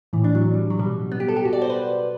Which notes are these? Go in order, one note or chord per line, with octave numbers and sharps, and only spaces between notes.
A2 E3
D4
F#3
G3
F#3
B2 G3
B3
G4
A4
G4
B2 F#4
D5
C5
B4